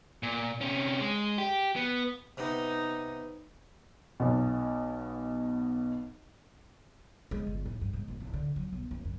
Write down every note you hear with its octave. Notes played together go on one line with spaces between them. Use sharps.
A#2
C3 C#4
G#3
G4
B3
C3 B3 D#4
B1 B2
G#3
G1
A2
G2
G#2
A#1
D1
D3
F#3
B1
F#1
F#2